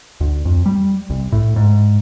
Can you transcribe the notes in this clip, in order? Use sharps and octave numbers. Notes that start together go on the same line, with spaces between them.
D2
F2
G3
C2
A2
G#2